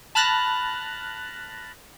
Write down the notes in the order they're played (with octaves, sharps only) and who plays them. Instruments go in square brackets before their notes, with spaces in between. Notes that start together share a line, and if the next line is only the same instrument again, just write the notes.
[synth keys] A5 B5 F6 F#6 A6 A#6